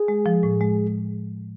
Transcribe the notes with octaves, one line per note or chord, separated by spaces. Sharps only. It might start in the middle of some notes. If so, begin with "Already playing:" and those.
Already playing: G#4
G#3
F3
A2
G#3